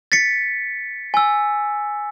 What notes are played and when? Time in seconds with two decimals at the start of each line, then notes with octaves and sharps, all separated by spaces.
0.12 A6 B6 C#7
1.14 G#5 E6